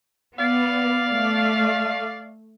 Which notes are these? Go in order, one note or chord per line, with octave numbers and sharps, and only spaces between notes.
B3 D5 F5
A3